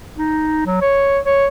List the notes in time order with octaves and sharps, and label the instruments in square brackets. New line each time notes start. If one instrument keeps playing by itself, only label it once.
[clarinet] D#4
F#3
C#5
C#5